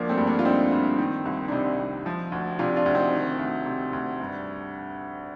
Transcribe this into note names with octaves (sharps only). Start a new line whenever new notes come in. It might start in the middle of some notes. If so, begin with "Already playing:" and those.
Already playing: D2 F3 A#3 D4
A3 C4
G2
A#3 D4
F4
D3 C4 D#4
G2
D#3
C2
D4
C3 C4 D#4
C2
F3
D2
C3 D4 F4
D4 F4
D2
C4 D#4
D#3
D2
C3
D2
G2